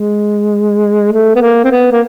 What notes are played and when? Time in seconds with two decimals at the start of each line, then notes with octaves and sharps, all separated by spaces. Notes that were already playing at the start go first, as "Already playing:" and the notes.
Already playing: G#3
1.12 A3
1.36 B3
1.41 A#3
1.64 C4
1.71 B3
1.92 A#3